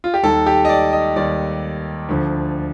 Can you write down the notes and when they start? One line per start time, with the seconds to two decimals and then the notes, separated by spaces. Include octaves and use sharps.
0.04 F4
0.14 G4
0.23 D#2 D#3 G3 A4
0.46 G4
0.65 D#5
0.69 D5
0.93 D#5
1.16 D#2 D#3 G3 D5
2.09 D2 D3 F3